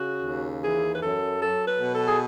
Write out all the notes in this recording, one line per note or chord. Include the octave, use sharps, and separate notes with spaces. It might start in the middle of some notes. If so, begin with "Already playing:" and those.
Already playing: C#3 F#4
D#2
E3 G#4
B4
F#2 A4
F#3 A4
B4
B2
A4
G#4